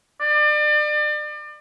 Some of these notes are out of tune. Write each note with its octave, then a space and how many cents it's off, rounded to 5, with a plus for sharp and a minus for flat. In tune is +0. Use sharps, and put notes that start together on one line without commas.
D5 +35